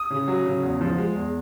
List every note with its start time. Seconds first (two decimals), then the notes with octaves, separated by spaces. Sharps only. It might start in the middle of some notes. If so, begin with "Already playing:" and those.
Already playing: D#6
0.11 C#3
0.28 F#3
0.46 C#3
0.63 E2
0.81 F3
0.98 G#3
1.15 E2